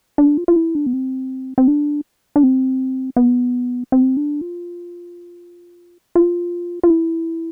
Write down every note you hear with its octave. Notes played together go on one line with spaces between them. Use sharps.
D4
F4
F4
E4
D4
B3
C4
C4
D4
D4
C4
B3
C4
D4
F4
F4
F4
E4